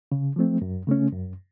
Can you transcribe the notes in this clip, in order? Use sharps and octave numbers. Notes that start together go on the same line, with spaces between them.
C#3
F3 A3 C4
F#2
C#3 A3 C#4
F#2